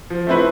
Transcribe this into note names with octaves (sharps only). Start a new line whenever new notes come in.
F3
A3 C4 E4 B4